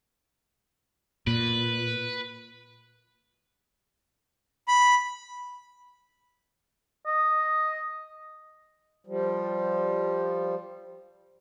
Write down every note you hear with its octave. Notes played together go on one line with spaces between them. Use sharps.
A#2 B4
B5
D#5
F3 G3